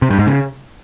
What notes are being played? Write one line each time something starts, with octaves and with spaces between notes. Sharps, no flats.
C3
G2
G#2
C#3